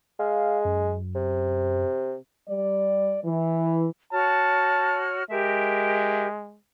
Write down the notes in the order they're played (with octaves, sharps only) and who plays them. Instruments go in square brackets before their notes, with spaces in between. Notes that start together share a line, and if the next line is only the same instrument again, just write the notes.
[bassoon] G#3 [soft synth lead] F5
[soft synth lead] F#2
[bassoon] C3
[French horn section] G3 D5
E3
[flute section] F#4 C#5 F6 [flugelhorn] A5
[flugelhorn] G#3 [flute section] G4 A#4 E5